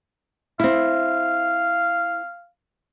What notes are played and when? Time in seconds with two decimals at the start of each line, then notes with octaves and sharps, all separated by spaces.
0.60 C4 E4 F5